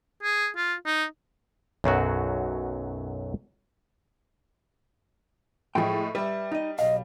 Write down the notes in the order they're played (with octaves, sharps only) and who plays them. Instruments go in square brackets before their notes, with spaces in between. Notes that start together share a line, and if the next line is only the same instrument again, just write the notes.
[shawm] G#4
F4
D#4
[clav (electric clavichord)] B1 F#2 F#3 F#4
[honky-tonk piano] A2 F3 G#3 [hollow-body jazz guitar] G#4 G5
[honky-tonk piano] G3 [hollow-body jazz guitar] B4 E5
[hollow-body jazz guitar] D#4 D#5
[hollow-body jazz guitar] B1 F#2 F5 [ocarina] D#5